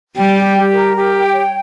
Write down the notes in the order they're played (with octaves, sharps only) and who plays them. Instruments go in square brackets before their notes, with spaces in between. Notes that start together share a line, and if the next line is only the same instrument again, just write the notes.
[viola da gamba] G3 [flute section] G5
[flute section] G4
G4
A#4
G4
G5
C#5